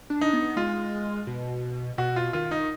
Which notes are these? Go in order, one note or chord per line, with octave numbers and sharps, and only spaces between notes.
D4
D#4
B3
G#3 F4
B2
B2 F#4
F4
D#3 F4
D#4